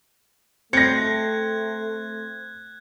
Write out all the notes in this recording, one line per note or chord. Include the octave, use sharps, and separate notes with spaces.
A3 C4 F#6 G#6 A#6 C#7